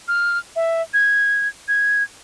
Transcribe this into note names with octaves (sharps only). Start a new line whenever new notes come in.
F6
E5
G#6
G#6